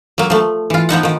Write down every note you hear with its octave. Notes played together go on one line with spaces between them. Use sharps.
F#3 A#3
F3 A3
E3 F4
F3 B3 D#4 F#5
D#3 F3